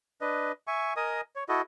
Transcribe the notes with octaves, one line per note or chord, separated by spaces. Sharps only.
D4 B4 D#5
E5 G#5 C#6
A#4 D#5 G#5 D#6
C#5
E4 F#4 A4 D#5